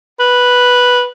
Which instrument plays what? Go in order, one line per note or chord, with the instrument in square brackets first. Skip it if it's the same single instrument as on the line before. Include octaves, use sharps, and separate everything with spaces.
[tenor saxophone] B4